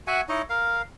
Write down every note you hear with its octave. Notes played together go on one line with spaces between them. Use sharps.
F#4 E5 F#5 G#5
D#4 E4 C#5 D#5
A#4 F5